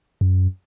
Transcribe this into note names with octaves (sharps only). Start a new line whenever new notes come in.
F#2